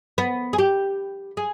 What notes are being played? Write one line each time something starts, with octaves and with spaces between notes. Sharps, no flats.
B3
G#4
G4
G#4